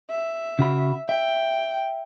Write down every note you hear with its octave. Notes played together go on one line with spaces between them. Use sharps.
E5
C#3 F#4 B5
E5 G5